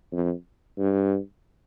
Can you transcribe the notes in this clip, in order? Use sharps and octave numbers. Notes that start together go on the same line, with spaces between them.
F2
G2